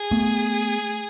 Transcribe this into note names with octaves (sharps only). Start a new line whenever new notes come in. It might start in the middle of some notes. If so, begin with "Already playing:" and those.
Already playing: G#4
A3 B3